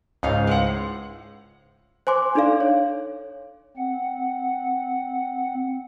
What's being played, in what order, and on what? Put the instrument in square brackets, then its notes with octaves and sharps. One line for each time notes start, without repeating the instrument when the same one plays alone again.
[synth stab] C#2 G#2 [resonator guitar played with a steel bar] D#4 F5
[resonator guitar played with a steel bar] A2 C5 F#5
[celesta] C5 G#5 C6 D6
D4 D#4 A4 D5 F5
C#5
[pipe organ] C4 F#5